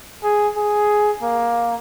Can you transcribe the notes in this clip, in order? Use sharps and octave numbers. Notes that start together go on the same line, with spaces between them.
G#4
G#4
A#3